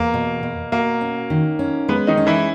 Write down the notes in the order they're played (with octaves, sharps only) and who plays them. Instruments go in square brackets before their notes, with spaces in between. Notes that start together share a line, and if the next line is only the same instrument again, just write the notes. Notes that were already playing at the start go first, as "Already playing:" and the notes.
Already playing: [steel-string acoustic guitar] E2 [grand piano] A#3
[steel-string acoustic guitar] B2
B2
[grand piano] A#3 [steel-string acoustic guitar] F#4
[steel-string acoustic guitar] C#4
D#3
C#4
[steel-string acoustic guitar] G#3 [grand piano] B3
[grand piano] D#3 D#4
[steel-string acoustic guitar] C#4
[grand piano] E3 E4